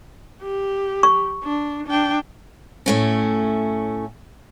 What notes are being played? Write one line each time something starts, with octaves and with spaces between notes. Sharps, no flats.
G4
C#6
D4
D4 G5
A2 A3 C#4